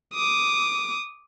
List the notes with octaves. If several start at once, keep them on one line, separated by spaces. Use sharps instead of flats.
D6 D#6